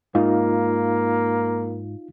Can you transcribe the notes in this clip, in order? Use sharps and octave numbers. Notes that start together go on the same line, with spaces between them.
G#2 A#3 D#4 F4 F5